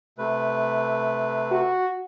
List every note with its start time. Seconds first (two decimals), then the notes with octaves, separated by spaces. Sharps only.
0.18 C3 A3 B4
1.51 F#4